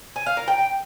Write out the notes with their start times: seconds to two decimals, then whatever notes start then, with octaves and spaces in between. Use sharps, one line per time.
0.16 G#5
0.26 F5
0.37 A#4
0.48 G5